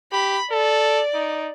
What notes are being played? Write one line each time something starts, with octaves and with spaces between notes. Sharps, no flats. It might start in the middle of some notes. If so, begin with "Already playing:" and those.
G4 B5
A4 D5
D#4